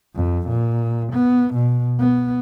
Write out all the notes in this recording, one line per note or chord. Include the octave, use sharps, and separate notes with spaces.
F2
A#2
B3
B2
B3